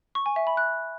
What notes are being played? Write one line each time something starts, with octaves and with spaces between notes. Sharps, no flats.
C#6
G#5
E5
B5
F#6